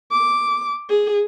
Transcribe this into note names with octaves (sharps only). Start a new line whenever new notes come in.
D6
G#4